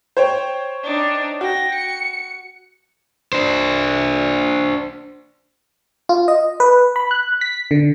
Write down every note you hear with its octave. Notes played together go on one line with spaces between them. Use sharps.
C5 C#5 G5
D4 D#4
F#4 G5 A#6
C#7
D4 C5
F4
D#5
B4
B5
F#6
B6
D3